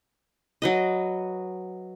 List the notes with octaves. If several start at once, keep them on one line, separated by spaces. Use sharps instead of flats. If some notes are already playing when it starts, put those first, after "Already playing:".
F#3 B4 D#5